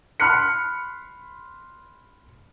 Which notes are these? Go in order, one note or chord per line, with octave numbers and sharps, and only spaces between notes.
B5 C6 F6 F#6 C#7